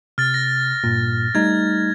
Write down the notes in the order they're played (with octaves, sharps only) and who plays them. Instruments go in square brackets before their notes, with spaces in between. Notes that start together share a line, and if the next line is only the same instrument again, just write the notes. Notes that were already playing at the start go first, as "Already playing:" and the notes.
[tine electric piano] C3 [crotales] F6 A6
[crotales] A#6
[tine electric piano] G2 A#2
[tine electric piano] G3 A3 D#4 [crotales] G#6